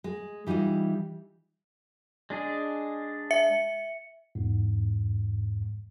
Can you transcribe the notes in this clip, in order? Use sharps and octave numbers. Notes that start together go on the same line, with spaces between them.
G#3
E3 G3 D#4 F4 D#5
G#3 D4 G#4
E5 C#7
E2 G#2